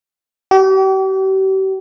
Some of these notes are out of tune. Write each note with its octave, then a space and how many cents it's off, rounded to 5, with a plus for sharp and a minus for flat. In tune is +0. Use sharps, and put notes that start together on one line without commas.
G4 -40